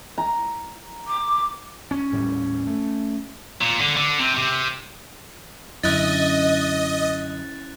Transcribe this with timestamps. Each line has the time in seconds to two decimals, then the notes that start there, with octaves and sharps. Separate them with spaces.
0.18 A#5
1.08 D6
1.91 C#4
2.12 D#1 A2 G3
2.67 A3
3.61 A#2
3.81 D3
3.97 D3
4.19 C3
4.37 C3
5.83 F#2 D3 C#4 E4 D#5 F#6 A6